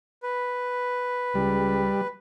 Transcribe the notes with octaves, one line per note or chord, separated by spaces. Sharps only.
B4
C#2 G3